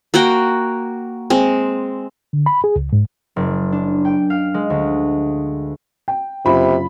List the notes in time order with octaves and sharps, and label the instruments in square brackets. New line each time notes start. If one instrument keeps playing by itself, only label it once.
[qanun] A#3 F#4 F#5 G5
G#3 C4
[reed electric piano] D3
B5
G#4
C#2
G#2
[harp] F#1
D4
G5
F5
G#3
D2
[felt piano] G5
[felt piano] F#1 F4 B5 [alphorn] C3